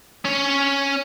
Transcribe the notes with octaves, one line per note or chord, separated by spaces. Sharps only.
C#4 C#5